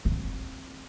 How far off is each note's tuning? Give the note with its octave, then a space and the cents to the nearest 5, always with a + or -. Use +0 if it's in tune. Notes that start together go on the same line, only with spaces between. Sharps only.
D#3 -20 C4 +20